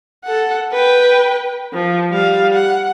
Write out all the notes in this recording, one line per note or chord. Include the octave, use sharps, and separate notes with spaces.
A4 F#5
B4 G5
F3
G3 F5
F#5